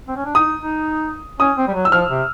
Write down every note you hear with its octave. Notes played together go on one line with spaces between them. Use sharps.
C4
C#4
D4
D#4 D#6
D#4
C#4 D#6
C4
G3
F#3
E6
F3 F6
C3